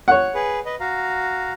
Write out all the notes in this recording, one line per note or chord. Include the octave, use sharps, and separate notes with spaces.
C#5 F#5
G#4 B4
B4 D#5
F#4 F5 A#5